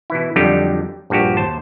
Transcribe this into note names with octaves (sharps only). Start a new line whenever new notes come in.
B2 E3 E4
F2 D3 F#3 G3 D#4 G4
A#1 G2 F3 F#4 G4
D#2 C5 A5